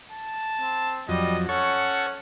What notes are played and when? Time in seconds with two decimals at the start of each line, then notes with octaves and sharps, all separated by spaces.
0.12 A5
0.61 C4
1.09 F2 F#3 G3 D#5
1.49 C#4 A4 C#5 F#5 C#6